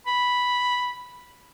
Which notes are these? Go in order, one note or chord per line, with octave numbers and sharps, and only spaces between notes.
B5